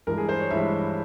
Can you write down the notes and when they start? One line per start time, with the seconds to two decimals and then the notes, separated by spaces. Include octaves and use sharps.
0.07 G2 E3 G#3 A#4
0.18 G#4
0.29 C5
0.40 C#5
0.51 G2 E3 G#3 E5